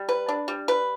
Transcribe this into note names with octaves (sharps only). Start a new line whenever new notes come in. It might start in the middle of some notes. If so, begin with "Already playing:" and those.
Already playing: G3
B4
D4
G3
B4